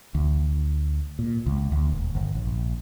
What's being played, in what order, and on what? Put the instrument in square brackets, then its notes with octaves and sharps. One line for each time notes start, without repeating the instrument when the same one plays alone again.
[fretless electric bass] D2
A#2
C#2
D2
D#1
G1
A#1